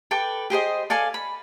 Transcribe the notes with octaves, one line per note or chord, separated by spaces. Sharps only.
A4 B4 G5 D6
G4 G#4 C5 D#5
A4 D5 F5 G#5
B5